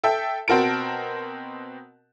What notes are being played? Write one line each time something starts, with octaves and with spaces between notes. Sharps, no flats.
A4 E5 G5
B2 C4 F#4 A#4 A5 D7